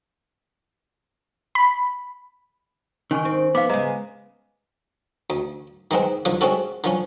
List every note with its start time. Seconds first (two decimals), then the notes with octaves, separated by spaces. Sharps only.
1.55 B5
3.11 D#3 C#4 G#5 C#6
3.25 C4
3.55 F3 B3 F5 D6
3.69 C#3 G#3 D#5 A#5
5.30 D2
5.91 D#3 G#3 B3 C4
6.25 D#2 D3 F3
6.41 G#3 C4 C#4 F#4 A4
6.84 D3 F3 C#4